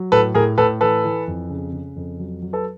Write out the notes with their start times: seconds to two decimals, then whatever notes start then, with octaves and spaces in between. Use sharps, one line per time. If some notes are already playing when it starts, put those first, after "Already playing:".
Already playing: F#3
0.12 A2 A4 B4
0.35 A2 G#4 A#4
0.58 A2 A4 B4
0.81 E3 A4 B4
1.04 E3
1.28 F2
1.50 C#3
1.72 C#3
1.96 F2
2.19 F#3
2.42 F#3
2.53 A4 B4